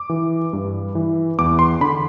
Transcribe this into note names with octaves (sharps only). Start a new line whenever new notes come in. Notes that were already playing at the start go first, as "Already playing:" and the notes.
Already playing: D6
E3
G2
E3
E2 D6
C6
D3 B5